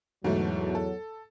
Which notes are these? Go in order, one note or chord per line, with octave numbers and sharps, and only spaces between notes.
E2 G#2 B2 F#3 A3
A4